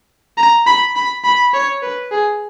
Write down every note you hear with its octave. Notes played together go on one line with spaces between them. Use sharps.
A#5
B5
B5
B5
C#5
B4
G#4